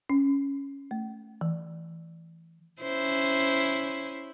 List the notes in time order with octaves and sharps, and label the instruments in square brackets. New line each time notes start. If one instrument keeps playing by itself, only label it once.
[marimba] C#4
A3
E3
[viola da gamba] C#4 E4 C5